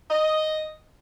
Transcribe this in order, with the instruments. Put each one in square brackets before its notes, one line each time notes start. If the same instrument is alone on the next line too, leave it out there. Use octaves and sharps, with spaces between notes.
[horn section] D#5